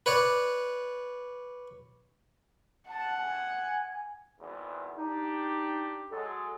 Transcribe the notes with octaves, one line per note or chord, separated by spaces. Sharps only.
B4 C#5 D5
F#5 A5
G#5
G#1 E2
D4 D#4 G4
F#3 G#3 A4